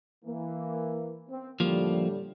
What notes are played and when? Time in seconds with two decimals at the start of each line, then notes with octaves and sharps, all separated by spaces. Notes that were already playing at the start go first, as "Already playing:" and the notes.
0.25 E3 A#3
1.30 C4
1.60 A2 D3 F3 G3 A#3